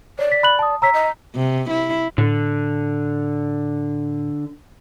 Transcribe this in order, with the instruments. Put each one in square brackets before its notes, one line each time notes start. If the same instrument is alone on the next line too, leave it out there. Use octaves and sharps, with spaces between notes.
[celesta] C#5 [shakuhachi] D5
[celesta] B6
B5 F#6 F#7
A5 D#6
[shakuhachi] C#5 [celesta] A#5 E6 B6
[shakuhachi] D#5
[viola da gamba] C3
E4
[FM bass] A2 [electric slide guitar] D3